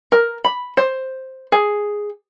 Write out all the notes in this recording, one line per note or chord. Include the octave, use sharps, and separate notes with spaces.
A#4
B5
C5
G#4